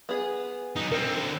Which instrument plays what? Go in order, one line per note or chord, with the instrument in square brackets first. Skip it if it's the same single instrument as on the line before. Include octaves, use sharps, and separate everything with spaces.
[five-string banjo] B3 G#4
[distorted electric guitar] F#3 D#4
[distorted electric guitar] D3 C4 [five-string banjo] A#4